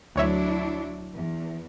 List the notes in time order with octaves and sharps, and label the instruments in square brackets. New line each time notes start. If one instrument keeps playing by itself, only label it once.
[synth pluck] D2 C#5 E5 [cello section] F#3 D4 E4
[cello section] E2